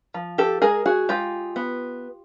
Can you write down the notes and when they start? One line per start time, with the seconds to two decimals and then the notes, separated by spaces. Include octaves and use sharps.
0.14 F3
0.38 G4 A4
0.62 G#3 G#4 A#4
0.86 F#4 G#4
1.09 G#3 F4 G4
1.56 B3